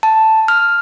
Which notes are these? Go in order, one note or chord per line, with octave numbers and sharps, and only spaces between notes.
A5
F6